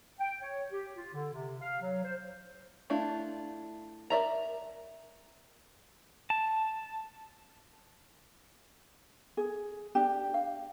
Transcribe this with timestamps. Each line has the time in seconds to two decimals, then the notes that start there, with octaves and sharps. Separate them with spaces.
0.20 G5
0.42 C#5
0.71 G4
0.96 F4
1.14 D3
1.33 C3
1.62 F5
1.81 F#3
2.04 C5
2.90 A3 D4 E4 F4
4.10 A#4 D5 E5 A#5
6.30 A5
9.37 G#4
9.95 D4 G4
10.34 F5